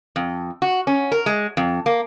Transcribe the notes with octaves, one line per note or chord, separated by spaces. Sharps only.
F2
F#4
C#4
A#4
G#3
F2
A#3